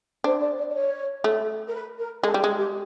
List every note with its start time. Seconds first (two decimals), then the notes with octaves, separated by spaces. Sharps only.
0.24 D4 C5
0.41 D5
0.57 D5
0.69 D5
0.74 C#5
1.24 A3
1.68 A#4
1.74 B4
1.99 A#4
2.23 G#3 A4
2.34 G3
2.41 G#3 G#4
2.58 G4